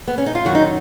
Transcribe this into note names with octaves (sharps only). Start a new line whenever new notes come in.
B3
C#4
D#4
F4
F#2 D#3 F#3 F#4
D#4